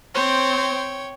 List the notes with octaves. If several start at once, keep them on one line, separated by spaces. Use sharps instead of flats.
C4 C5 C#5 G5